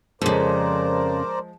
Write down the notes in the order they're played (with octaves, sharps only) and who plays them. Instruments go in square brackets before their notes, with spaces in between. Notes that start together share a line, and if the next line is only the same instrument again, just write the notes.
[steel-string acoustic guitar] F2 C#3 [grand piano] F3 G#3 [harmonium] A#4 C5 D5